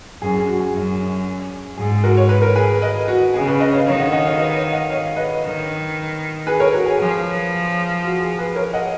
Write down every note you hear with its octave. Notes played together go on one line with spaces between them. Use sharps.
F#2 G#4
G#4
F#4
G#4
F#2
G#2 G#4
G#4
F#4 A#4
C#5
B4
A#4
G#4 B4
B4 D#5
F#4
C#3 G#4
G#4 B4
B4 D#5
C#5 F5
D#3 C#5 F5
D#5 F#5
D#5 F#5
C#5 F5
B4 D#5
C#5 F5
D#5 F#5
C#5 F5
B4 D#5
D#3
G#4 B4
A#4 C#5
F#4 A#4
G#4
F3 G#4
F#4
G#4
G#4 B4
A#4 C#5
D#5 F#5